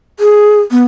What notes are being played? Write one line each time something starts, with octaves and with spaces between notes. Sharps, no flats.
G#4
B3